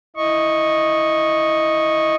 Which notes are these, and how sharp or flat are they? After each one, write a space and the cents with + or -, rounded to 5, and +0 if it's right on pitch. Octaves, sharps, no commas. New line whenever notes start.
E4 -5 D#5 +0 C#6 -10